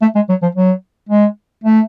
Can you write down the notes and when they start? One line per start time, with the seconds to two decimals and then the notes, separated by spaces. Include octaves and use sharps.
0.02 A3
0.15 G#3
0.29 F#3
0.42 F3
0.55 F#3
1.09 G#3
1.64 A3